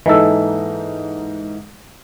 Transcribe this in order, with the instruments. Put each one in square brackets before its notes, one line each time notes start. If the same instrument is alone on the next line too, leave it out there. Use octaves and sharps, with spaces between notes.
[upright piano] G#2 A#3 D#4 [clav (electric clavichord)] E3 A4